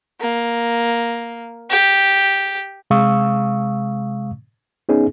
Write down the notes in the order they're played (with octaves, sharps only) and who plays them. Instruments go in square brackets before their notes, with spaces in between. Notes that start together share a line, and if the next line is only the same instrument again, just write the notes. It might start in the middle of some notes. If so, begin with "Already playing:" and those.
[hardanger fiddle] A#3
G4
[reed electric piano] C3 G#3 F5 C#6 D#6 E6
B3 C#4 D#4 G#4